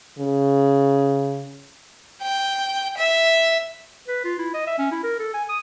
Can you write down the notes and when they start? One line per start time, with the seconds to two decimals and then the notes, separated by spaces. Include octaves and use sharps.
0.19 C#3
2.22 G5
2.98 E5
4.08 B4
4.24 F4
4.38 E4
4.54 D#5
4.67 E5
4.78 C#4
4.91 E4
5.03 A#4
5.19 A4
5.34 G#5
5.49 D#6